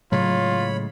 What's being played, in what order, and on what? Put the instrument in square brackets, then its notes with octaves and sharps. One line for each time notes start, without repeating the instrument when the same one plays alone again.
[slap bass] A2 C#3 G#3 [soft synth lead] F#3 [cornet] F4 [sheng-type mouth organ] C#5 B5